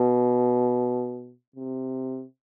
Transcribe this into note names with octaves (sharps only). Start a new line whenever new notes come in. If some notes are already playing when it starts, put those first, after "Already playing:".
Already playing: B2
C3